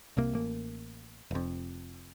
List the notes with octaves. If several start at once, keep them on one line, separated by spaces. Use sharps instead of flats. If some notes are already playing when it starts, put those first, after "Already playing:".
C2 C3 A#3
A1 A#3
F1 F2